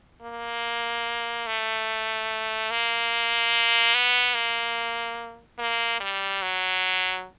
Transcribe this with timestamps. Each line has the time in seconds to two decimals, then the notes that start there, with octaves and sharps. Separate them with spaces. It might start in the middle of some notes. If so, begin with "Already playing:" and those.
0.22 A#3
1.47 A3
2.71 A#3
3.94 B3
4.34 A#3
5.58 A#3
6.00 G3
6.42 F#3